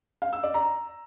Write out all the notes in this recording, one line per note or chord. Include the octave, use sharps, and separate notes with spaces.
F5
E6
D5
A#5